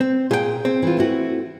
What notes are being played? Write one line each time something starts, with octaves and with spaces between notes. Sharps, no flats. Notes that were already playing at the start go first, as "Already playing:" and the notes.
C4
A#2 G#4 G5
C4
E3 F4
A3 E4 F#4